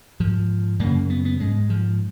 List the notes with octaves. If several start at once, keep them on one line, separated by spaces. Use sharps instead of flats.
G#2 F3
F#2 C#3 A#3
B3
B3
G#2 G#3
F3